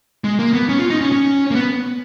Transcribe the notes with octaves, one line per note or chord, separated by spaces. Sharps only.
G#3
A#3
B3
C#4
F4
D#4
C#4
C#4
A#3
B3